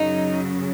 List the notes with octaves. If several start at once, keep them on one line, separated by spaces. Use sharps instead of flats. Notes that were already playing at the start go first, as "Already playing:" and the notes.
Already playing: F#2 C#3 F#3 D#4